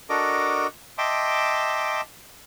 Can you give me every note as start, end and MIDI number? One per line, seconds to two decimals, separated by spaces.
0.10 0.67 62
0.10 0.67 66
0.10 0.67 69
0.10 0.67 70
0.10 0.67 75
0.10 0.67 86
0.98 2.01 75
0.98 2.01 76
0.98 2.01 79
0.98 2.01 81
0.98 2.01 84
0.98 2.01 86